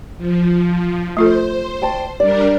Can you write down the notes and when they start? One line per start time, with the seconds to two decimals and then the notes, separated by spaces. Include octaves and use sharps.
0.17 F3
1.17 A3 F4 A4 C5
1.82 D2 G5 A5
2.20 G3 D4 A#4 D5